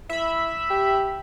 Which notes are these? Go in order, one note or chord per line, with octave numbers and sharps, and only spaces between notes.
E4 E5 B5
G4